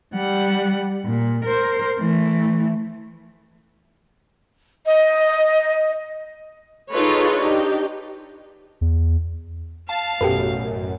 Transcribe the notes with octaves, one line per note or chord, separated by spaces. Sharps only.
G3 F#5
A#2
A#4 C5
E3 A3
D#5
D#4 F4 G#4 A4 B4 C#5
D4 D#4 G4
E2
F5 A5
A1 F#2 B2 G4 A4 B4